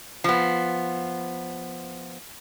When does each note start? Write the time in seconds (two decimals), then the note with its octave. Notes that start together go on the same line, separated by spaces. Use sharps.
0.24 F3 B3